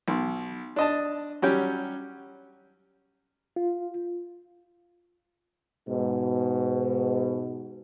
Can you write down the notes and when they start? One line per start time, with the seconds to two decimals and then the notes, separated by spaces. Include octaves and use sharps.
0.08 B1
0.76 D4 D#5 A5
1.42 F#3 G3 C#4 G4 G5
3.56 F4
5.88 G#2 B2